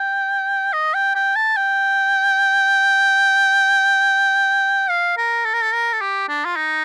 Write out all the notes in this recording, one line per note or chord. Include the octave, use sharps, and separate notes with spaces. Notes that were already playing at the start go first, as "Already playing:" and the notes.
Already playing: G5
D#5
G5
G5
A5
G5
F5
A#4
A4
A#4
A4
A#4
A4
G4
D4
F4
D#4